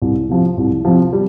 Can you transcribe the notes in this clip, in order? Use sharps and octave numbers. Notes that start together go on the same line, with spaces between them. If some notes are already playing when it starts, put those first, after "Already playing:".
C2
C3 F3
C2
C3 F3
G3